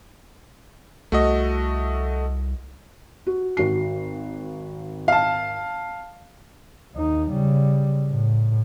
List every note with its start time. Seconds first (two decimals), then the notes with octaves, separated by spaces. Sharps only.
1.12 C2 A3 F#4 D#5
3.27 F#4
3.57 G#1 F#4 C7
5.08 F5 A5
6.95 D#2 D#4
7.31 C#3 G3
8.10 A2